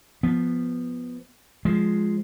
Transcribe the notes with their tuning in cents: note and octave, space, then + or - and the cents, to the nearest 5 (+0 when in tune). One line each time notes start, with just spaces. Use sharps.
F3 +0 B3 -5
F3 +0 G#3 +0